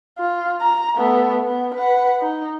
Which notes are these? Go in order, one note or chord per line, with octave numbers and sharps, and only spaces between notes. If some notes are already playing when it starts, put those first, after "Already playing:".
F4
A#5
A3 B3
B3
B4 F#5
D#4